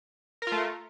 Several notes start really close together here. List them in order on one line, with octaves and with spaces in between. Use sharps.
A#4 F4 A3